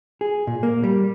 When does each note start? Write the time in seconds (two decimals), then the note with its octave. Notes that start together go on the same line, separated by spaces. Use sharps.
0.21 G#4
0.47 A#2
0.63 A#3
0.84 G3